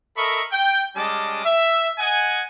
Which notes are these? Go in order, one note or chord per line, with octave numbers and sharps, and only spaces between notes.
A4 A#4 D#5 E5 B5 C#6
G5
G3 G#3 C#4 D#5 A5 D6
E5
D#5 F#5 G#5